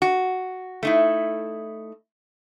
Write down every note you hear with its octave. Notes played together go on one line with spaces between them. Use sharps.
F#4
A3 D#4 E4